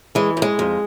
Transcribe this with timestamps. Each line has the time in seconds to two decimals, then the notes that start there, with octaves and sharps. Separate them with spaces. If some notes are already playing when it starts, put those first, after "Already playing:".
0.15 E3 G#3
0.37 G#2
0.42 G#3
0.59 F2